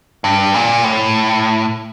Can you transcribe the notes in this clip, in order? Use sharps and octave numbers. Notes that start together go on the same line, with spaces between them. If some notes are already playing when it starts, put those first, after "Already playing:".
G2
A#2
A2